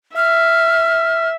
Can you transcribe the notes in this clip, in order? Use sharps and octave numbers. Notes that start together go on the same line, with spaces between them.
E5 F6